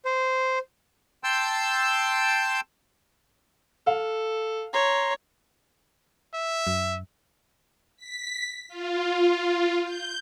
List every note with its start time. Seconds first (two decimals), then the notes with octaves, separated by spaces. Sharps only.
0.05 C5
1.24 G5 A5 C6 E6 G6
3.87 A4 F5
4.74 C#5 A#5 C6
6.34 E5
6.67 F#2
7.97 B6
8.68 F4
9.83 G6